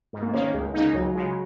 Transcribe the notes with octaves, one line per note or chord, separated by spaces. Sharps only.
G#2
A#3
D#3 A#3 C#4
C#2 G#3
C#3 A#3 D#4
C#2 F#3
C#3 G#3